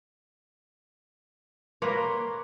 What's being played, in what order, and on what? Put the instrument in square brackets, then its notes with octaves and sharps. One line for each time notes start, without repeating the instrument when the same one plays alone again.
[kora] A#3 B4 C#5 [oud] A#4 [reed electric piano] C6 D6